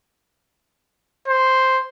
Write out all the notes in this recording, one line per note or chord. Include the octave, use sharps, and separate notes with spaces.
C5